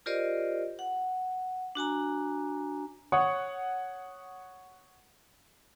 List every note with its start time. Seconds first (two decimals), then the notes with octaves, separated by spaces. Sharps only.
0.06 F4 G4 A#4 C5 D5 D#5
0.79 F#5
1.75 D4 F#4 G#5 A#5
3.12 C#5 F#5 C#6 D#6